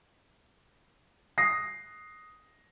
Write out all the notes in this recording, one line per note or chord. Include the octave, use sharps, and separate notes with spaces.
D#6 A#6 C7